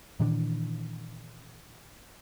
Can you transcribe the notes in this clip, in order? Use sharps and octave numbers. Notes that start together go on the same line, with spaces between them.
A#2 D#3 E3 D4